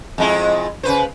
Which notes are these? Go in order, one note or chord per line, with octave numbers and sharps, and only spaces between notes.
F2 G#3 E4
C#3 B4 C5